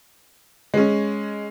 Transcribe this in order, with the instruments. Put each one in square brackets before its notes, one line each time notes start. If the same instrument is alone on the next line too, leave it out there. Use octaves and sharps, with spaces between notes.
[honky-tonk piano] G#3 C#4